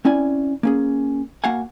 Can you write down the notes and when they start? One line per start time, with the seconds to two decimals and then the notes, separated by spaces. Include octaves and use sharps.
0.05 C4 C#4 E4 D5 G#5
0.63 A#3 C#4 G#4
1.44 A#3 F#4 F5 F#5 G#5